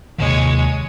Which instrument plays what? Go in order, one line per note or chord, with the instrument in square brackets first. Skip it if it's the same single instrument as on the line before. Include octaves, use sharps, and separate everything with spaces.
[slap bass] D#2 C3 D#3 [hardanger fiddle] G#3 C#5